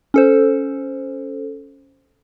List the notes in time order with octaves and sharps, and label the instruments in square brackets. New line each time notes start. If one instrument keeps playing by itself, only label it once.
[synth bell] C#4 A4 C5